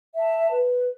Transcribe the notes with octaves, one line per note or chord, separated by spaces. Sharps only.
E5 A5
B4